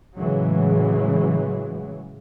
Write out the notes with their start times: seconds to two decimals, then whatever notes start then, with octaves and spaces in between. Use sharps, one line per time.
0.17 A2 C#3 E3 F#3 G#3